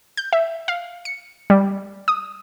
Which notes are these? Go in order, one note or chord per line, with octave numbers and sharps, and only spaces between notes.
G6
E5
F5
C#7
G3
D#6